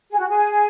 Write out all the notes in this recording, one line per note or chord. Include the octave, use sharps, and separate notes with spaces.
G#4
F#4
G#4